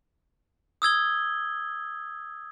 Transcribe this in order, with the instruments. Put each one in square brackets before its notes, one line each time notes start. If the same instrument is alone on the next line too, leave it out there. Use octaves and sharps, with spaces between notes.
[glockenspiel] D#6 E6 G#6 G7